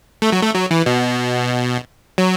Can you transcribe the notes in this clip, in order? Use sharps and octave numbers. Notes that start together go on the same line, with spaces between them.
A3
F#3
A3
F#3
E3
B2
F#3